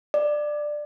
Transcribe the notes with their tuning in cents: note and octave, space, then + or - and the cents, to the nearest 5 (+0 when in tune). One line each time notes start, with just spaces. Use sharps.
D5 +15